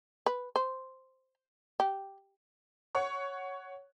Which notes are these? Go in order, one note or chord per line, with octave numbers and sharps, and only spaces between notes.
B4
C5
G4
C#5 F#5 C#6